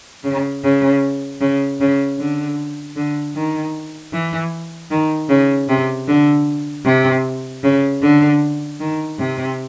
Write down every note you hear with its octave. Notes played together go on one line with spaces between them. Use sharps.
C#3
C#3
C#3
C#3
D3
D3
D#3
E3
D#3
C#3
C3
D3
C3
C#3
D3
D#3
C3